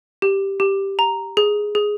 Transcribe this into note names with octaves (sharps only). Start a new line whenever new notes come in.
G4
G4
A#5
G#4
G#4